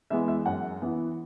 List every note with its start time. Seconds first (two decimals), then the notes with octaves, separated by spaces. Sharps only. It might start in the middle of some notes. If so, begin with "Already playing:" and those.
0.10 E3 G#3 B3 E5
0.28 E5
0.46 F#2 F#5
0.82 E3 B3